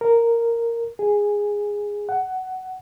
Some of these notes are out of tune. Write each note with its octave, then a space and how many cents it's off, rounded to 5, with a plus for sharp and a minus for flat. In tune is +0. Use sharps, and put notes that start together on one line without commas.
A#4 -5
G#4 -10
F#5 +15